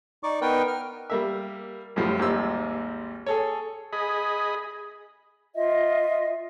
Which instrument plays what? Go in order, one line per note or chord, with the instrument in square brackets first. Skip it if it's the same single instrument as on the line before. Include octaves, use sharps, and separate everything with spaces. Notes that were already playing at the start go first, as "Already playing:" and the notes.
[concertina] D#4 D5 C#6 D6
B3 D#4 A#4 B4 G5
F6
[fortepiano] G3 A#3 E5
F#2 A2 F3 G3
G#1 D#2 G3 G#3 C5 E6
G#4 A4 C#5
[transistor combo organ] G#4 D#5 B5
[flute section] F4 D#5 E5